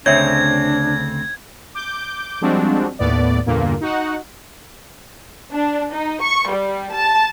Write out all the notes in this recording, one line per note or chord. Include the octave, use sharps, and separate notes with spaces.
D2 C#3 C4 D4 C#5 E5 G#6
D6 G6
F3 G3 G#3 C4 D4 F#4
D#2 A2 B3 D5
E2 G2 A#2 D3 A#3
D#4 F#4 F#5
D4
D#4
C#6
G3
A5